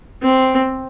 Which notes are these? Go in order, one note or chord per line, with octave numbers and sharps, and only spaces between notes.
C4